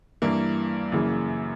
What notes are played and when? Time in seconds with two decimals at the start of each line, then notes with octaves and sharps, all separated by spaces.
0.22 G2 E3 A#3 E4
0.92 F#2 C#3 E3 A#3